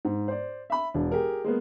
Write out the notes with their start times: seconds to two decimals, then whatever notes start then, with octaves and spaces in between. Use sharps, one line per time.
0.05 G#2
0.28 C5 D5
0.70 E5 B5
0.94 E1 D4
1.12 G4 G#4 A#4
1.44 G#3 A#3 B3